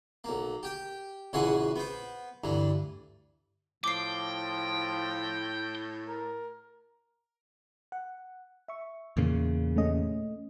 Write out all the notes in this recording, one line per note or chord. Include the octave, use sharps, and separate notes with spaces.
B1 A#3
G4 G5
A#1 C#3 E3 F#4 G#5 C6
B3 C5
D2 G2 E3
A2 F3 G5 D6 C7
A#4
F#5
E5 C#6
E2 A#2 C#3
A3 C#4 D#5